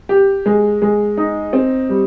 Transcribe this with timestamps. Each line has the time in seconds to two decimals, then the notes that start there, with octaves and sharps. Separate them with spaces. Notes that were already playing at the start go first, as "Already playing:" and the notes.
0.09 G4
0.46 G#3
0.82 G#3
1.17 D#4
1.53 C4
1.89 G3